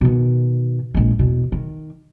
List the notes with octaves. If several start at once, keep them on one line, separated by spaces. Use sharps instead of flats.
B2 D#3
A#1 G#3
E2 B2
D#3